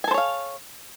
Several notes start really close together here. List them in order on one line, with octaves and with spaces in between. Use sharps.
G#5 A4 C5 C#5 F5